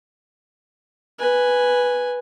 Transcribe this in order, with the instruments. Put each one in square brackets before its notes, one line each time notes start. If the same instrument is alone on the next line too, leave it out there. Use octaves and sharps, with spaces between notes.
[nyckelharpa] B4 G#5